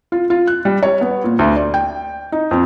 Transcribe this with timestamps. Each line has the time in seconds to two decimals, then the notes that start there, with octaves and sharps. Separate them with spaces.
0.12 F4
0.30 F4
0.47 F#6
0.65 G3
0.83 C#5
1.01 B3
1.24 A#2
1.39 D2
1.56 D5
1.74 G5
2.32 D#4
2.51 F2